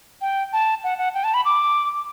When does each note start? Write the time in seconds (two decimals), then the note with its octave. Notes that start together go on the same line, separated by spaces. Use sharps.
0.21 G5
0.53 A5
0.84 F#5
0.98 F#5
1.14 G5
1.24 A5
1.34 B5
1.45 D6